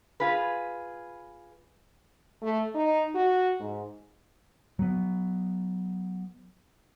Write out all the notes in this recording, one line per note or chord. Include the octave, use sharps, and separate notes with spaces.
F4 G#4 B4
A3
D#4
F#4
G#2
F#3 B3